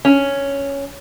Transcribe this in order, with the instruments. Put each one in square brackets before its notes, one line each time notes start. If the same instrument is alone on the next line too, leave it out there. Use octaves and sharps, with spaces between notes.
[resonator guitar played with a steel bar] C#4